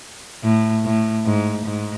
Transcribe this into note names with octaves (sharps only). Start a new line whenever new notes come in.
A2
A2
G#2
G#2